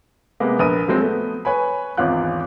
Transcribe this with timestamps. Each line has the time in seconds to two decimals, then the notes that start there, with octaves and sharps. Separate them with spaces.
0.40 C3 G#3 A#3 B3
0.59 A#1 A#4 B4 D#6 D#7
0.88 F3 F#3 G#3 C4
1.00 A3 B3
1.45 B4 C#5 G#5 B5
1.97 G#1 E2 C#4 F4 F#6